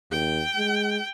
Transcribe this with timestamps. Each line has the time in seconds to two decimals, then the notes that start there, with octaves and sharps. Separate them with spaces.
0.11 D#2 G5
0.56 G#3